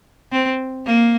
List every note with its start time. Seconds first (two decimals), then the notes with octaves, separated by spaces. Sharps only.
0.32 C4
0.86 A#3